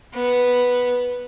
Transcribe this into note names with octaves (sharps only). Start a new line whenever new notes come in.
B3